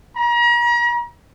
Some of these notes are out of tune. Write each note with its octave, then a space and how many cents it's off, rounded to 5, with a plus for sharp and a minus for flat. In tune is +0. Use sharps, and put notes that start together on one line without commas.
A#5 +40